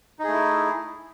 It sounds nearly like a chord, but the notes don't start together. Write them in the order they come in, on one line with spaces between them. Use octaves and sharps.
D#4 G#4 A3 E4